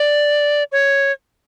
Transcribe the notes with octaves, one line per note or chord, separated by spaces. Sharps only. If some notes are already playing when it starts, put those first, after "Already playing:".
Already playing: D5
C#5